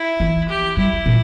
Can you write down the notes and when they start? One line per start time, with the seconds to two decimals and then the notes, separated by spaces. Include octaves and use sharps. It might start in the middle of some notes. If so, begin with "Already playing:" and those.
Already playing: E4
0.20 E3
0.49 G4
0.77 G3 E4
1.06 A#2